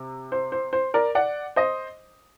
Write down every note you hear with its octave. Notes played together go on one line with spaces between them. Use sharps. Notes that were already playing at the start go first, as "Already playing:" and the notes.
Already playing: C3
C5
C5
C5
A#4 D5
D5 F#5
C5 D#5